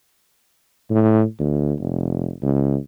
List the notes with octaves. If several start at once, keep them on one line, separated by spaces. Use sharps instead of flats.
A2
D2
F1
C#2